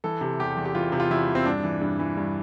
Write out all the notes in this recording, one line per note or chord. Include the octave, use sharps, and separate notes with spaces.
E3 A4
C3
E2 G4
E2
G4
E3 F4
C3
F4
E2 E4
E2
C4
G2 D4
E3
G2
E3
G2